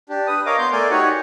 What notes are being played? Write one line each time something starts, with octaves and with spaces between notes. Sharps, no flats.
D4 G4
B4 D#6
A#4 C#5 D#5 F5 D6
B3 C6 G6
A3 A#4 D5 G#5
D#4 F#4 G4 C#5 F#5 G#5